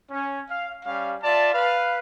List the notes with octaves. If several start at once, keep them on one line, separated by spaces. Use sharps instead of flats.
C#4
F5
G3 C#4 F5
F4 D5 E5 A5
B4 F5